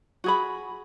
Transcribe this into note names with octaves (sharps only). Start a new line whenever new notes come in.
F#4 G#4 B5